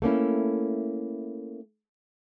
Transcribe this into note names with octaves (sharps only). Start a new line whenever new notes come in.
A3 A#3 C#4 E4